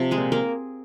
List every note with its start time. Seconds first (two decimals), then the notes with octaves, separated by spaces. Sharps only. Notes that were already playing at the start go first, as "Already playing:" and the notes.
Already playing: C3 F3 C4
0.11 G#3 G#4
0.18 A#2
0.32 A#3 A#4